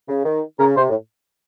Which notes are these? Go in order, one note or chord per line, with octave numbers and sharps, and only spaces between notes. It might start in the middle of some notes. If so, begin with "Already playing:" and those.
C#3
D#3
C#3 A#4
C3 C5
A2